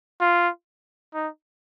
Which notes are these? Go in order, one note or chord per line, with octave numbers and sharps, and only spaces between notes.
F4
D#4